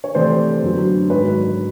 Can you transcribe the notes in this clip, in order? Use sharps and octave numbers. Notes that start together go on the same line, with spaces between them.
C#5
C3 E3 A3 C4 C5 D5
F#2 D3 F#3 B3
G#2 D#3 F#3 B4 C#5